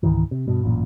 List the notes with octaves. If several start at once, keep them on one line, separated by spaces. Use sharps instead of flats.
C#2 G#2 D#3 E3
C3
G2 B2
A1 F#2 A#2